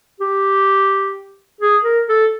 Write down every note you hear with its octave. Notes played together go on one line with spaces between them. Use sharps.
G4
G#4
A#4
A4